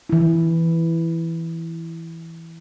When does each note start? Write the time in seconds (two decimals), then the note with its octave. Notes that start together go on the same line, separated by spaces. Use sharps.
0.09 E3 E4